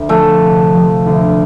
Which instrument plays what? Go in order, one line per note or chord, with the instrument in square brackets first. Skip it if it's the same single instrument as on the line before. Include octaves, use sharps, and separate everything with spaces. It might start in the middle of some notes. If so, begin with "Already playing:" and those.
Already playing: [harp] D2
[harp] F3 [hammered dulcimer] A3
[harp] C3
F3
D2